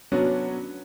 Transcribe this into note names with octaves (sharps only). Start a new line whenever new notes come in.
F#3 B3 C#4 D4 F#4